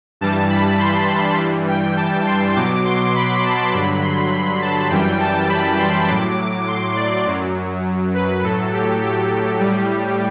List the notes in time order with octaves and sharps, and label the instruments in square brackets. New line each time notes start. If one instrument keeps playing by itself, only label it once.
[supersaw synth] G2 E3 G3 A5
B5
C6
C6
G2 E3 G3
G5
A5
C6
B2 F#3 D6
C6
B5
A5
G2 D3 F#3 B5
C6
B5
A5
F#2 E3 G3 G5
A5
B5
C6
A2 F#3 D6
D6
C6
D5
F#2 F#3
B4
A2 F#3 A4
G4
G4
A2 G3